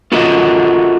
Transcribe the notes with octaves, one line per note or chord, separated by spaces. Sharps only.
F4 F#4 A4 A#4 D#5 E5